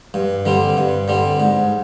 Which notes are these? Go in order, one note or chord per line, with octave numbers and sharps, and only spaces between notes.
G2
D3 G3 C4
G2
D3 G3 C4
G#2